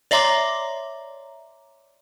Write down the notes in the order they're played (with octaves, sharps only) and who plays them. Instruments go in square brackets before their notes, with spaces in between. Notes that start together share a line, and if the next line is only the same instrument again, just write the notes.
[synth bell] C#5 D5 E5 A#5 C6 D6